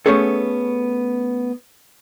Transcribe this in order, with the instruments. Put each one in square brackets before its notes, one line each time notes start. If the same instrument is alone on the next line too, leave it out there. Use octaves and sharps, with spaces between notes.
[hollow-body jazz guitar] A3 B3 C#4 G#4 A4